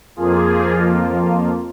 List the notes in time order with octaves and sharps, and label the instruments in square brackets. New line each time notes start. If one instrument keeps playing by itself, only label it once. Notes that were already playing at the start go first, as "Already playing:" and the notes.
[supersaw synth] F2 F3 A#3 F4 G#4